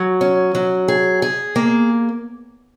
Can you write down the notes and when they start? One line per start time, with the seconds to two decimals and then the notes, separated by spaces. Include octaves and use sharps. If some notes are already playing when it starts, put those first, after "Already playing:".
Already playing: F#3
0.21 C#4
0.55 F#3
0.88 G#4
1.22 G#4
1.56 A#3